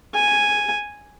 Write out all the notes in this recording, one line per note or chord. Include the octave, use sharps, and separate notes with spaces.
G#5